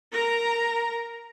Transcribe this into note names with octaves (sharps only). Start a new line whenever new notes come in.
A#4 A#5